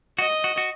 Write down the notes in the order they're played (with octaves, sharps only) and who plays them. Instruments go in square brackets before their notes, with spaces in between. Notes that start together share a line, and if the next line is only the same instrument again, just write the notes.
[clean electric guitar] F#4 [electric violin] D#5
[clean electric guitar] F#4
F#4